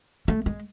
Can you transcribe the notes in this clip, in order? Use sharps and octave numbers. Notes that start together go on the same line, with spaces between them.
A3
G#3